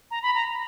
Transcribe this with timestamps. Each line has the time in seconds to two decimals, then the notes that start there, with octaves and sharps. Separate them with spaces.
0.11 A#5
0.23 B5
0.35 A#5